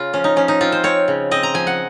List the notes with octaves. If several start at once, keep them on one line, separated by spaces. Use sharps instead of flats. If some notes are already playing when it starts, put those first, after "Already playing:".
Already playing: C#3 F4
F3 C#4
D#4
F3 C#4
D#4
C4 F4
C5
C4 C#5
C#3
C4 D#5
A#5
F3 G#5
F#5